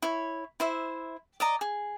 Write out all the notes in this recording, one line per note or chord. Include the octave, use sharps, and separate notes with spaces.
E4 C#5
E4 C5 E5
D5 D#5 A#5
G#4